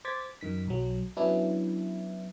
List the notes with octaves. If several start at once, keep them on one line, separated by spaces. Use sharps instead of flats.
C5 D6 G#6 A6 B6
F#2 D#3 B6
B1 F#3
F#3 B3 C#4 D4 E4